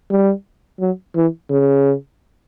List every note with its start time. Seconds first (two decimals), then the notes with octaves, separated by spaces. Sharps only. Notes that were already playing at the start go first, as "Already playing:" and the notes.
0.10 G3
0.80 F#3
1.16 E3
1.50 C#3